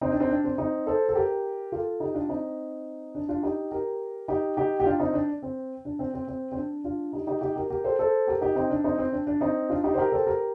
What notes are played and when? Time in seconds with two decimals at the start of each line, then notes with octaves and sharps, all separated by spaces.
0.01 C4 D#4
0.11 D4
0.20 C4 D#4
0.30 D4
0.44 C4
0.58 C4 D#4
0.86 A4 C5
1.09 A4
1.15 G4 A#4
1.72 F4 A4
2.00 D#4 G4
2.14 D4 F4
2.29 C4 D#4
3.15 D4
3.29 D4 F4
3.43 D#4 G4
3.71 G4 A#4
4.28 D#4 G4
4.57 D#4 G4
4.80 G4
4.85 D4 F4
5.00 C4 D#4
5.13 D4
5.43 C4
5.85 D4
5.99 C4
6.14 C4
6.28 C4
6.52 C4
6.56 D4
6.84 D4 F4
7.13 D#4 G4
7.27 D#4 G4
7.41 D#4 G4
7.56 G4 A#4
7.70 G4 A#4
7.84 A4 C5
7.99 A4 C5
8.27 G4 A#4
8.41 D#4 G4
8.56 C4 D#4
8.70 D4
8.84 C4 D#4
8.98 C4
9.12 D4
9.27 D4
9.41 C4 D#4
9.69 D4 F4
9.84 D#4 G4
9.94 C5
9.98 G4 A#4
10.12 A4 C5
10.26 G4 A#4